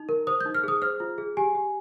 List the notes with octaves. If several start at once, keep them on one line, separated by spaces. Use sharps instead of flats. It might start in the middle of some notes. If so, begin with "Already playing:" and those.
Already playing: D#4
A#4
C5 D#6
G6
D#4
F6
G#4 D#6
C5 F6
F4
G#4
G4 G#5
G4